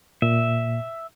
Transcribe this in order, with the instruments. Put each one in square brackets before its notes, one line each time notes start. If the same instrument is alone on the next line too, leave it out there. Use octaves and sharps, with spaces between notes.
[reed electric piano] A#2 [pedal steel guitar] E5